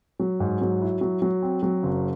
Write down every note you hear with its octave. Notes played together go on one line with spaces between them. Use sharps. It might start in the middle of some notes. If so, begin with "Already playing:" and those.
F#3
G#2
F#3
E4
F#3
F#3
C4
F#3
F#1